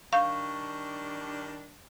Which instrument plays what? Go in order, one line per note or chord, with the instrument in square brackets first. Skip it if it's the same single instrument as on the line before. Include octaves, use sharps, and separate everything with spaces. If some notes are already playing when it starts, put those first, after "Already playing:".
[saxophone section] D#3 G3 D4 [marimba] F5 G6 [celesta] C#6